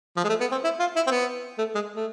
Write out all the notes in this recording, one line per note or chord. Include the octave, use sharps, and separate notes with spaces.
F3
G#3
A3
B3
C4
E4
F4
E4
C4
B3
A3
G#3
A3